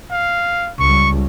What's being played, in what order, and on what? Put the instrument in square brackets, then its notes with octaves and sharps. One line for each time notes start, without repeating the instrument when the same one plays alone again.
[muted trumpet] F5
[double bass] C#2 G3 [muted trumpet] C#6